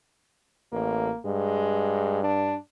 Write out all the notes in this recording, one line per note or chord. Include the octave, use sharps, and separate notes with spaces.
A1 A#3
G2 G#3
D4